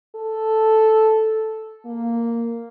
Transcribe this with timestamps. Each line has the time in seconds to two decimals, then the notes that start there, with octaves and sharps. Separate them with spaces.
0.15 A4
1.86 A#3